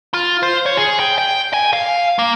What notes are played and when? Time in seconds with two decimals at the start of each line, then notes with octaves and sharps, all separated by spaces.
0.14 F4
0.43 C5
0.66 C#5
0.77 G#4
1.00 G5
1.18 G5
1.53 G#5
1.73 F5
2.19 A#3